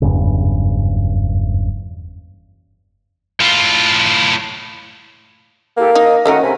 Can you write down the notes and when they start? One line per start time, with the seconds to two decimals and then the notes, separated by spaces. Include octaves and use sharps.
0.02 F#1 E2 G2 C#3
3.41 A2 F4
5.77 A#3 E4 G4 A4
5.95 D#4 D#5 D#6
6.26 D#3 A3 C#4 F#4 A#4 D#5 F#5
6.44 C3 G#5 B5